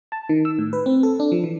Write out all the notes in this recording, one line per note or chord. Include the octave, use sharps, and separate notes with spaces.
A5
D#3
E6
A2
B4
C4
A4
D4
F3
E3